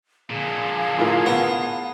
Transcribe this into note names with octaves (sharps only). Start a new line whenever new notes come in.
A#2 D3 G#4 F5 A5
A2 F4 A#4
B3